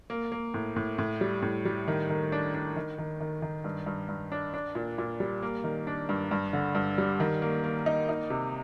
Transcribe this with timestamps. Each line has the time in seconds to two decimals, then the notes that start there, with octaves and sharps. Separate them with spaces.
0.10 A#3
0.32 A#3
0.54 A2
0.76 A2
0.98 A2
1.21 G3
1.42 A2
1.65 G3
1.88 D#3
2.09 D#3
2.32 D4
2.54 D4
2.76 D#3
2.98 D#3
3.20 D#3
3.42 D#3
3.64 G2
3.86 G2
4.09 G2
4.32 D4
4.54 D4
4.75 A#2
4.98 A#2
5.20 G3
5.42 A#3
5.64 D#3
5.87 D4
6.09 G2
6.31 G2
6.53 D3
6.75 G2
6.98 G3
7.20 D#3
7.42 A#3
7.64 A#3
7.86 D#4
8.09 D#4
8.30 C3